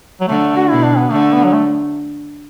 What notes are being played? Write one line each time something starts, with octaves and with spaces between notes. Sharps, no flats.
F#3
D3 A3
F#4
B2 E4
D4
B3
D3 A3
B3
F#3
A3